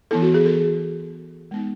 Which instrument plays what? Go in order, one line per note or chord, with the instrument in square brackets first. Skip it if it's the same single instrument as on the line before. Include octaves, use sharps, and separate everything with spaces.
[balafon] E3 B3 E4 A4
F#4
G#4
A4
G#3 B3 D#4